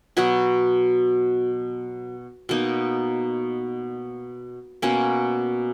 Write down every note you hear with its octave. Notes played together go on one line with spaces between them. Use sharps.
B2 F#3 B3 F#4
B2 A#3 D#4
B2 A#3 C#4